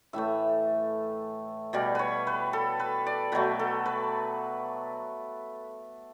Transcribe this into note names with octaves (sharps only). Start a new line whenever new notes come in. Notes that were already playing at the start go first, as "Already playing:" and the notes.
A2 E3 A3 E5
B2 G3 D5
B4 C#5
B4
A4
B4
D5
B2 F#3 A3 B4
A4
B4